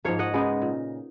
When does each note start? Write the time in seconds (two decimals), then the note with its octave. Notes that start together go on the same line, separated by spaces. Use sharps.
0.04 G#2 F3 A#3 C#5 F5
0.19 D#5 F#5
0.34 C#3 G#3 B3 D#4
0.62 A#2